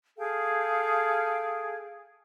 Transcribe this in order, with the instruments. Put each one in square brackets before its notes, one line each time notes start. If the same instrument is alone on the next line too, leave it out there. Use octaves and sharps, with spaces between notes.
[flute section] G#4 A4 F5 G5